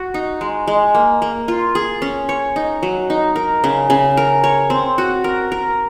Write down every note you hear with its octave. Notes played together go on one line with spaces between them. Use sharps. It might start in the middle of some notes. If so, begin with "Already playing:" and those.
Already playing: F#4
D#4
G#3
G#3
A#3
A#3
F4
G#4
C#4
C#5
D#4
F#3
D#4
A#4
C#3
C#3
A#4
C#5
C4
F#4
A#4
A#4